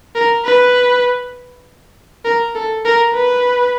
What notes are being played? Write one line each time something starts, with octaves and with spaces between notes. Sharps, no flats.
A#4
B4
A#4
A4
A#4
B4